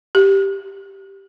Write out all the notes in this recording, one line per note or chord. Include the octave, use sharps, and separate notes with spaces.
G4